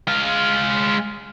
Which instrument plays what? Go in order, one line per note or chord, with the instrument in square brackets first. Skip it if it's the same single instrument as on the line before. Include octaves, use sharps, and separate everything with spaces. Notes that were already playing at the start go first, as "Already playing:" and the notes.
[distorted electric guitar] G#3 F5